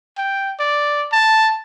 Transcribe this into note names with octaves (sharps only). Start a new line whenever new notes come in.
G5
D5
A5